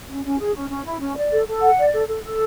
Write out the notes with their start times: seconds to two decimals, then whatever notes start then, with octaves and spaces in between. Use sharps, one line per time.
0.10 C#4
0.24 C#4
0.39 G#4
0.55 C#4
0.70 C#4
0.85 E4
1.01 C#4
1.17 D5
1.32 A4
1.47 A4
1.62 F#5
1.78 D5
1.93 A4
2.08 A4
2.24 A4